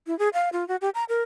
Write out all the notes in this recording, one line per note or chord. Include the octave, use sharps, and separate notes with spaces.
E4
G#4
F5
F4
F#4
G4
A#5
A#4